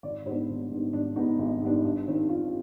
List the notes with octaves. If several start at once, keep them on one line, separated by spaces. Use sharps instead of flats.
G#1 D5
G#2 G3 B3 D4 C5
G#1
G#2 G3 B3 D4
G#1 D4
G#2 G3 B3 D4 D#4
G#1
G#2 G3 B3 D4
G2
D#3 G3 C4
G2 F4